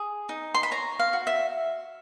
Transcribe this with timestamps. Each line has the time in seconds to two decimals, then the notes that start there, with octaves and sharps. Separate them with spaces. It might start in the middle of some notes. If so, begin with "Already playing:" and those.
Already playing: G#4
0.29 D#4
0.55 C6
0.63 B5
0.71 C#5 A#5
0.99 F5
1.13 F#4
1.27 E5